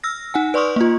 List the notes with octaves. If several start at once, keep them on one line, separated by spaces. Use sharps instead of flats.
E6 F6 A#6
D#4 F#5 G#5
B4 D5 C6 C#6 D#6 F6
A#3 F4